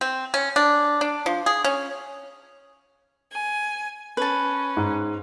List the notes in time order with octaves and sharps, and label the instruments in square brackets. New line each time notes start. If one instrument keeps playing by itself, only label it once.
[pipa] C4
C#4
D4
D4
F3
G#4
C#4
[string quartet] G#5
[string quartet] C#4 [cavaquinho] B4 A5
[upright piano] G#2